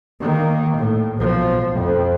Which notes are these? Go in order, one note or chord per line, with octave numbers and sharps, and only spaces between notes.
D#3 A#3
A2
B1 F3
F2